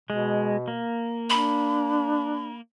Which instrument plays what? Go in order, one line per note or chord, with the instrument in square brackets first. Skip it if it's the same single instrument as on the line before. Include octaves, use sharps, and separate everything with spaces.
[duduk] B2 [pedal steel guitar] G#3
[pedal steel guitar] A#3
[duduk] D4 [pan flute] B5